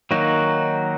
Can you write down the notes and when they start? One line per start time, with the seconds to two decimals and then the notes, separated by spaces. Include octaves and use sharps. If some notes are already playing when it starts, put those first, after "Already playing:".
0.11 D#3 F#3 A#3 D#4 F#4